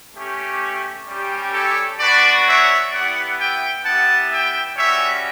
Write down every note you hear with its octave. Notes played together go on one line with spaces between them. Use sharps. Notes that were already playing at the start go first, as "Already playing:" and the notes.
A3 C#4 G4
G3 C#4 G4
A4 C#5
B3 D4 F#4 B4 D5
C#5 E5
B3 E4 G4 D5 F#5
E5 G5
B3 E4 G4 F#5 A5
E5 G5
G3 C#4 F#4 C#5 E5